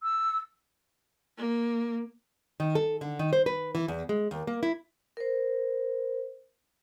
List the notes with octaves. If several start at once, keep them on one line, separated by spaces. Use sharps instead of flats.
E6
A#3
D#3
A4
D3
D#3
C5
B4
E3
E2
G#3
D#2
A#3
E4
A#4 C5